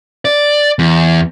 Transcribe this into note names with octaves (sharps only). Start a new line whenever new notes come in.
D5
E2